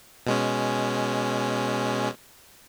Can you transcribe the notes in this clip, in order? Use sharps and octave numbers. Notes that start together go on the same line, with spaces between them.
B2 G#3 C#4